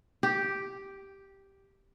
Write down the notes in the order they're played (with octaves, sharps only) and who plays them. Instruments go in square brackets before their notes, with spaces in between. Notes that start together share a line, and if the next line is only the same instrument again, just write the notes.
[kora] G4